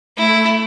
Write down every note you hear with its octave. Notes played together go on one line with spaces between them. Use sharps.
A3 E4